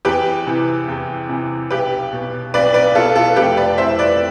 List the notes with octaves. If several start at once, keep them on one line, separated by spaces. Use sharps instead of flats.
E2 G4 B4
C3 E3
E2
C3 E3
B1 G4 B4
B2
B1 B4 D5
B4 D5
B2 F4 A4
F4 A4
F1 G4 B4
B4 D5
F2 E3 C5 E5
B4 D5